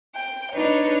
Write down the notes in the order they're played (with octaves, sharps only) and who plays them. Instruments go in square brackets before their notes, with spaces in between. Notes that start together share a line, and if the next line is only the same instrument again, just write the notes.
[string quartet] G5
D4 D#4 B4 C#5